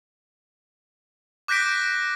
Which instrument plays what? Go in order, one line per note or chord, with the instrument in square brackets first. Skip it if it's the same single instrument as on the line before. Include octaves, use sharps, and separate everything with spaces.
[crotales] D6 F#6 G6 A#6 B6 D7